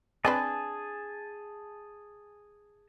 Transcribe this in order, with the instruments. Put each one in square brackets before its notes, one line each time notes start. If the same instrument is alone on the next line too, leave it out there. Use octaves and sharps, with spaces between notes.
[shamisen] C4 D4 B4 [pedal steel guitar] G#4 G#5 A5